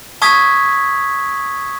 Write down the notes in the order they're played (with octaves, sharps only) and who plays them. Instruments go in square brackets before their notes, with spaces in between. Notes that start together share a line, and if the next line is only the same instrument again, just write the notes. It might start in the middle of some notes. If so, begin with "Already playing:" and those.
[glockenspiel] A5 C#6 D#6 E6 G#6 B6